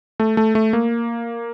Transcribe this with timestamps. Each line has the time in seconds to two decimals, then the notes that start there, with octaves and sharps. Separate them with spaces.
0.20 A3
0.37 A3
0.55 A3
0.73 A#3